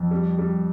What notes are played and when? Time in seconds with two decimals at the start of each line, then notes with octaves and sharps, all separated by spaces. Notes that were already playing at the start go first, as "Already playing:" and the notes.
Already playing: F2
0.11 G3
0.39 G3